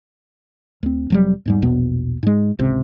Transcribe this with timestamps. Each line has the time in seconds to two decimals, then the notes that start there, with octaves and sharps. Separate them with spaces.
0.83 D2 C4
1.10 F1 F#3 G3
1.46 E2 G#2 G3
1.62 A#1 E2 B2 B3
2.23 G#2 G#3
2.59 G#1 C#2 C3